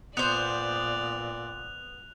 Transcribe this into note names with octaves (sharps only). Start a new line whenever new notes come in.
A#2 B3 C5 D5 F#6 F7